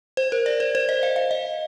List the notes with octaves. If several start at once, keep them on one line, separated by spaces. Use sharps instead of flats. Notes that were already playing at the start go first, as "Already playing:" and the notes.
C5
A#4
D5
C5
C5
D#5
F5
F5
D#5